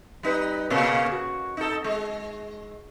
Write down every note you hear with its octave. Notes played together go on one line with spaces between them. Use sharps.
G3 D#4 B4
A#2 C#3 A#3
F#4
D#4 A4
G#3